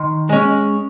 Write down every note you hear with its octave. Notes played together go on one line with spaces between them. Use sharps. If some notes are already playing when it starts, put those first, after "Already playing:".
Already playing: D#3 C6
G#3 C#4